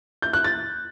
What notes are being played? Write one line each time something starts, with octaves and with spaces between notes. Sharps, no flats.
G6
F#6
A6